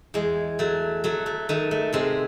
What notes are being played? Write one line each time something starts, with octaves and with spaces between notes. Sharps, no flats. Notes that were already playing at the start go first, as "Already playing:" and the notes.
E2 G#3
F#3 A3
F#3 A3
A3
D#3 A3
A3
C3 G#3 C4